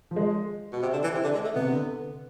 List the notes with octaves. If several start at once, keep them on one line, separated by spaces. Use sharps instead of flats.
F3
G#3
B2
C3
D3
E3
C3
D3
G#3
A3
C3 B3
D3